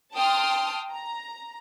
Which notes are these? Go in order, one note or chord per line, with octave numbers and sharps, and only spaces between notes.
G5 A5 C6 D#6 F6
A#5